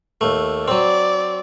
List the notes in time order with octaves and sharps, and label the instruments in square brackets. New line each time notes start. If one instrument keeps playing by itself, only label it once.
[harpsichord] D#2 A3
[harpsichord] F#3 C4 [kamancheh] D5